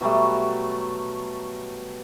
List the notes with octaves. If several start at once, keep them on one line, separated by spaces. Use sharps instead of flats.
B2 F#3 G3 A3